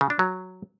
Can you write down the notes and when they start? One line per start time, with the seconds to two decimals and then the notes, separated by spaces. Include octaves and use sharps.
0.01 C#3
0.10 D4
0.19 F#3